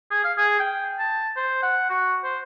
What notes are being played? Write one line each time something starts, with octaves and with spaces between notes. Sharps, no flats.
G#4
F5
G#4
G5
A5
C5
F#5
F#4
C5